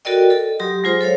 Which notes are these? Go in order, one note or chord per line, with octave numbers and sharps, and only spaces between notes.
F#4 A4 A#4 D5 D#5 G5
A4
F#3 G4 C6 D#6
F#3 G#3 F4 G#4 C5 C6
A4 C5 C#5 F5